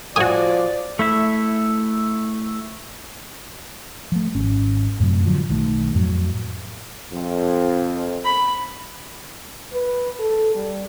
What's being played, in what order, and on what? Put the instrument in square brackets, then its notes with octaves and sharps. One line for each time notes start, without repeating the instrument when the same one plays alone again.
[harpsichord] A2 D#6 [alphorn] F3 [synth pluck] F#4 G#5 [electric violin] D5
[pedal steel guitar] A3 E4 E5
[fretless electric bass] F3 A3
G#1 C#4
F#2 A2 C3 F#3
D3 F3 F#3
B1 D#3 G3 A3
F2 A2 F3 F#3
[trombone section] F2
[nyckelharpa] B5
[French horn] B4
A4
G3